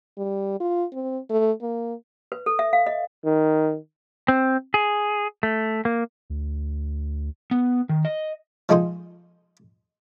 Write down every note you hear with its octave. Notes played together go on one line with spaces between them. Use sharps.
G3
F4
C4
A3
A#3
B4
A4
E5
F5
D#5
D#3
C4
G#4
A3
A#3
D2
B3
D#3
D#5
F3 G#3 D#4 G#4 C5